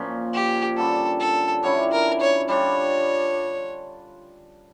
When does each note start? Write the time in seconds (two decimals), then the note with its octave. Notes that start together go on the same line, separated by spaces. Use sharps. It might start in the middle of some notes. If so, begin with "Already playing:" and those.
Already playing: A#2 F3 A#3 C#4
0.34 G4
0.77 D3 G3 C#4 A4
1.20 A4
1.63 D3 G3 C#4 E4 C#5
1.92 A#4
2.20 C#5
2.49 G3 D4 F4 C#5